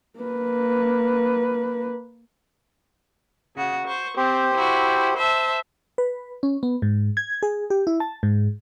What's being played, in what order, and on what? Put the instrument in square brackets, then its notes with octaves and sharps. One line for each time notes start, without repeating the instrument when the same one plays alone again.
[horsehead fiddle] A#3 B4
[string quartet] C#3 F#4
C5 C#6
[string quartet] C4 [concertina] G4 C5
[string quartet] E4 F#4
C5 E5 A5
[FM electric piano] B4
C#4
B3
G#2
G#6
G#4
G4
E4
A5
G#2